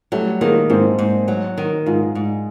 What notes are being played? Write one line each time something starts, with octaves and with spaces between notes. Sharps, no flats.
F#3 G3 A3
D#3 G#3 A#3
G#2 A#3 C4
G#2
F#3
D#3
G#2 D#4 F4
G#2